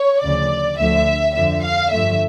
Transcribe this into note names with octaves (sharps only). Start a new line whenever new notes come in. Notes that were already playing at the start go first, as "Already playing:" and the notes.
Already playing: C#5
D2 C#3 F3 D5
D2 D3 F3 A3 E5
F2 D3 F3 E5
F5
G2 D3 F3 A3 E5